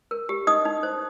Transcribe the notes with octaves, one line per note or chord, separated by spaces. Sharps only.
A#4
G4
D#4 D#5 D#6
D#4
C5